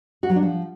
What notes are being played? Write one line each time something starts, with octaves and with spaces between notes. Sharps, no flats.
F#4
F#3
D4
F3